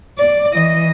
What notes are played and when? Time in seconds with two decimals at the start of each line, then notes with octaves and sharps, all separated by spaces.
0.18 D5
0.53 E3 D#5